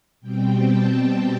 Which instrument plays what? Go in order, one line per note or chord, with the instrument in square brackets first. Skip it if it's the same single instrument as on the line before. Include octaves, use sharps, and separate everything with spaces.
[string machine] B2 G3 C4 G5
A5
A5